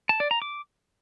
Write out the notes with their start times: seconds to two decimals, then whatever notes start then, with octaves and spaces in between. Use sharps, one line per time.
0.09 A5
0.20 D5
0.31 A#5
0.42 D6